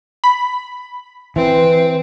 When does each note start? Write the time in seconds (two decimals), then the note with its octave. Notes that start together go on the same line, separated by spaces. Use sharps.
0.24 B5
1.36 E3 C4 B4